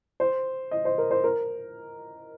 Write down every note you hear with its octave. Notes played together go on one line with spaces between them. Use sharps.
C5
D#5
C5
A#4
C5
A#4